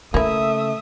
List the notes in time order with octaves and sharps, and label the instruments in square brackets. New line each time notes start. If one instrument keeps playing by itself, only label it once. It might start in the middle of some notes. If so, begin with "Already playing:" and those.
[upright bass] C#3 [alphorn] A3 [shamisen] A#3 E4 [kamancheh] E5 D#6